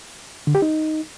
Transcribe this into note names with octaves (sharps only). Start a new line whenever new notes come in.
D3
G4
D#4